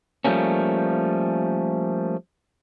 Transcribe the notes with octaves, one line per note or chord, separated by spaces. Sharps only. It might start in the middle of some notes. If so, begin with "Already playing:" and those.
F3 G3 A3 A#3 C#4